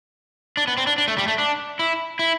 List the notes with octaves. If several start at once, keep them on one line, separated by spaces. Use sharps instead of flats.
D4
B3
C4
D4
D4
A3
G3
A3
D4
E4
E4